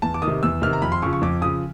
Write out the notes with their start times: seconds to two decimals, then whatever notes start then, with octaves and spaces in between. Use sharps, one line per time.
0.02 E2 A5
0.14 D6
0.22 D#3 D#6
0.28 C3
0.43 E2 E6
0.62 C3 D#3 F6
0.73 A#5
0.82 F2 B5
0.92 C6
1.02 C#3 F3 C#6
1.13 C#6
1.22 F2 D6
1.42 C#3 F3 D#6